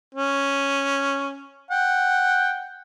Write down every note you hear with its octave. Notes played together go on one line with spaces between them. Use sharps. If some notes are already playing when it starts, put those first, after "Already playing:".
C#4
F#5 G5